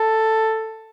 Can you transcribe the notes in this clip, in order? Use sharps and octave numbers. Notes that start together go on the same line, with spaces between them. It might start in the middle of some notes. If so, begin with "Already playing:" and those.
Already playing: A4